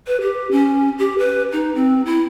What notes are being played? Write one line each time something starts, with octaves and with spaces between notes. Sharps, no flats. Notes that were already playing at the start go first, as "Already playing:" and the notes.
B4
G4
C#4
G4
B4
D#4
C4
E4